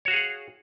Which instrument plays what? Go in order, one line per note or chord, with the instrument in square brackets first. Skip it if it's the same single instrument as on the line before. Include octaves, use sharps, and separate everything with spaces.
[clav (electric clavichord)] C#5
F#4
F5
G#4
F#5